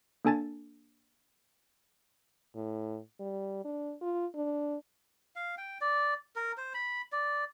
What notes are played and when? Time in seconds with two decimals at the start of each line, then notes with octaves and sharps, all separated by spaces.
0.25 A#3 D4 A4 G#5 A5 A6
2.55 A2
3.20 G3
3.65 D4
4.01 F4
4.35 D4
5.36 F5
5.58 G5
5.81 D5
6.36 A#4
6.57 C5
6.74 B5
7.12 D5